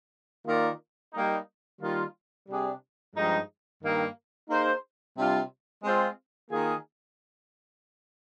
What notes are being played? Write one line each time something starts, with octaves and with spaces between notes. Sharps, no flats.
D#3 A#3 F4 A#4 D5
G3 A#3 D#4
D#3 G3 A#3 F4
C3 G3 D4 G#4
G2 F3 G#3 D#4
G2 D#3 A#3 D#4
A#3 D#4 G#4 C5
C3 G3 D4 F4
G#3 C4 F4
D#3 A#3 F4 G#4